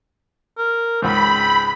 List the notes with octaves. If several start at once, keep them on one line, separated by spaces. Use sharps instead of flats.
A#4
C#2 G#2 C4 B5